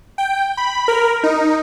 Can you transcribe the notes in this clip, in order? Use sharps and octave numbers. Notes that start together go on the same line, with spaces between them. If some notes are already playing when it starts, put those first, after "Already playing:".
G5
B5
A#4
D#4